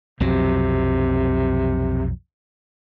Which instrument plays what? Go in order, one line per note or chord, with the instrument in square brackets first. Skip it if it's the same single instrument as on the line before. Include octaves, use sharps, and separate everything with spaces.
[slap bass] B1 F2 F#3 [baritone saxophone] C3